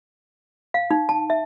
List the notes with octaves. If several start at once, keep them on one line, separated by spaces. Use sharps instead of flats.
F5
D#4
A5
E5